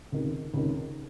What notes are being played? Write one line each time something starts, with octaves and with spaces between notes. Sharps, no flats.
C#2 C3 D#3
C#2 C3 D#3